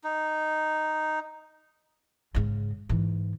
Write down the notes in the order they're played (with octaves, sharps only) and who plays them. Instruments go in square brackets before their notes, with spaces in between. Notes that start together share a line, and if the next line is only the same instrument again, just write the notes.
[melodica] D#4
[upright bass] G#2 C#3
G#2 E3